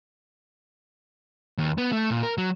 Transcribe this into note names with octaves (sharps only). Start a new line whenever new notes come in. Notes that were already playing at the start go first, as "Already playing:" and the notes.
D#2
B3
A3
A#2
A#4
F#3